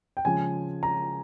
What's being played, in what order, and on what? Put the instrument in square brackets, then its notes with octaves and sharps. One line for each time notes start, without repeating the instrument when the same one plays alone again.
[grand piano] G5
C#3 F3 G#3 G#5
A#5